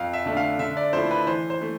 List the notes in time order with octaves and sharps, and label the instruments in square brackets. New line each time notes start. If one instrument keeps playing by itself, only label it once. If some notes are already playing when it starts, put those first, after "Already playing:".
Already playing: [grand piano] F2 F5
E5
D3 A3 D4
F5
D3 E5
D5
F3 A3 E4 C5
B4
E3 C5
C5
A3